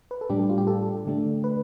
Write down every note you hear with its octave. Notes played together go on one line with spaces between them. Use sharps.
B4
A4
A2 G3 D4 G4
G4
F4
G4
A4
D3 A3 D4
B4